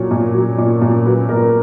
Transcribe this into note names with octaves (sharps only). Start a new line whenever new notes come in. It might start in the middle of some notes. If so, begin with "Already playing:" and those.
Already playing: A#2 F#3 C#5
A#2
F#3
A#2
A#2
F#3 B4
A#2 A#4